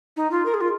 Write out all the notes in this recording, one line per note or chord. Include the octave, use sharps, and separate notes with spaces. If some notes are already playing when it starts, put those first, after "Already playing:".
D#4
F4
A#4
G#4
F4